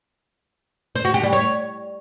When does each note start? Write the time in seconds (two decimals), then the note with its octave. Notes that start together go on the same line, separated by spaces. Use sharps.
0.95 C5
1.05 F#4
1.14 G4
1.23 G3
1.33 C#5